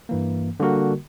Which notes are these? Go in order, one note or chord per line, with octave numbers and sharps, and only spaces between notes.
G2 E3 A#3
D3 G3 A#3 F#4 A#4